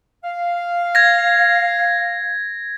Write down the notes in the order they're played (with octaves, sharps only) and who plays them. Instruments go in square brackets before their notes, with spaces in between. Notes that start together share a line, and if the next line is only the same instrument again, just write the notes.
[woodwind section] F5
[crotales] G#6 A#6